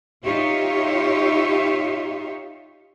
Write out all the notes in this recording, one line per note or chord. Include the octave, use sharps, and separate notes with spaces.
D#4 F4 G4 C#5 E5